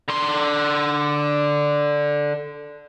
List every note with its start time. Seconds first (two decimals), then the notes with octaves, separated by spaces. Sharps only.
0.08 D3 C6